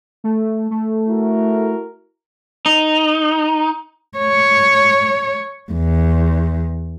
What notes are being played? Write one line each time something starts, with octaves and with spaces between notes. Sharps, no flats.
A3
A3
E4 F#4 A#4
D#4
C#5
E2